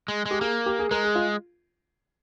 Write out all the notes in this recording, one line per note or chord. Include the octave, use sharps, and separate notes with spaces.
G#3
G#3
G4
A#3 G#4
G4
G#4
G#3 A#4
G#4
F4